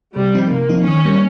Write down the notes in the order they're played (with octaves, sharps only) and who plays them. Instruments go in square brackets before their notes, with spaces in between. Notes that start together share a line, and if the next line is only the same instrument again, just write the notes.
[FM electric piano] C3 [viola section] G3
[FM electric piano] F3 C4 D#4
[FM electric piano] C3 [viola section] A#3
[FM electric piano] F3 C4 D#4
[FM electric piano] D#3 [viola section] C#4
[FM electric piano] G3 A#3